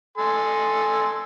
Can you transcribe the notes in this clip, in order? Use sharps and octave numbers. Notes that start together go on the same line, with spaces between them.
A4 G#5 C6